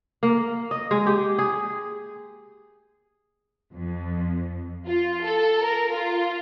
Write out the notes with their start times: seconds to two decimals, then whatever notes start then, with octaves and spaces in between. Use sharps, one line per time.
0.23 A#3
0.71 D#5
0.91 G#3
1.07 G4
1.38 G#4
3.73 F2
4.88 F4
5.25 A4
5.64 A#4
5.94 F4